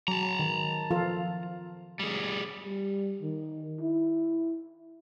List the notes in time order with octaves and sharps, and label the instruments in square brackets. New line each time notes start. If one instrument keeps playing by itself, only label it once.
[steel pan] F#3 [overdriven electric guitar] A5 A#5
[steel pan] D#3
F3 F4 A4
[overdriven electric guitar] G3 G#4
[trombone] G3
D#3
E4